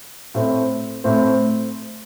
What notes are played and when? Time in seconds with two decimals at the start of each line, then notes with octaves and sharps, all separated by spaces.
0.35 A2 A3 C4
1.04 A2 A3 C4